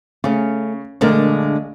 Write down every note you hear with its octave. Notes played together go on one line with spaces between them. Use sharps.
C#3 A3 C#4
A#1 D3 G#3 A3 A#4